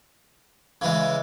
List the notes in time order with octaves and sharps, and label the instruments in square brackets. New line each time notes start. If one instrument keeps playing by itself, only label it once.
[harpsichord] C#3 E3 G#3